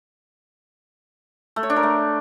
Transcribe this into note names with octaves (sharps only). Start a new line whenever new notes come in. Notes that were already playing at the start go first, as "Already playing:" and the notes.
A3
C#5
D4
A#4
A3